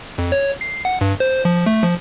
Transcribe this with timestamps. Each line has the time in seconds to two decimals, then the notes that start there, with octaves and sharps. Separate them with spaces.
0.18 F2
0.32 C#5
0.61 C7
0.85 F#5
1.01 G2
1.20 C5
1.45 F3
1.66 A3
1.84 F3